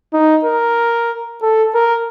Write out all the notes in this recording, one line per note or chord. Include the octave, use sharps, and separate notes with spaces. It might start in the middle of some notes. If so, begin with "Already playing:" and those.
D#4
A#4
A4
A#4